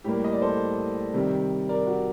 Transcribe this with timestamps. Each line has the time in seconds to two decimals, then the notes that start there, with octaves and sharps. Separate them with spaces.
0.04 A2 G3 A#3 G4
0.24 D#5
0.33 D5
0.42 A4 C5
1.13 C3 D#3 G3
1.69 A#4 D5
1.87 F#4